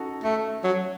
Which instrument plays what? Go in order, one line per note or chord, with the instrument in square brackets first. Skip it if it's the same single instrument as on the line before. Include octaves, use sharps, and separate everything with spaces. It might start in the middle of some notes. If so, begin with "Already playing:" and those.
Already playing: [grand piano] C#4 D#4 F#4 A4
[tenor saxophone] A3 [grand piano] A4
[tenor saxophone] F#3